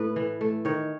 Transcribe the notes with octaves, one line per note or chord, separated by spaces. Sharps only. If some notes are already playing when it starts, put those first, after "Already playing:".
Already playing: A2 B4
E3
A3
D#3 C#5